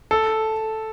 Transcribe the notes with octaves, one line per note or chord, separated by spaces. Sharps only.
A4